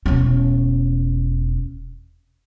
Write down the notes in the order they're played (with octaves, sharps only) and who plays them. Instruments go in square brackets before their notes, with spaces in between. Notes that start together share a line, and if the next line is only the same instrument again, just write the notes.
[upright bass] E1 C#4